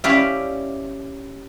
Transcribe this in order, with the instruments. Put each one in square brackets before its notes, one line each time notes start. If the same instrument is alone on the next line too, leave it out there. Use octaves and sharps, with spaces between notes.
[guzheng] C#4 E4 G4 D5 E5 F5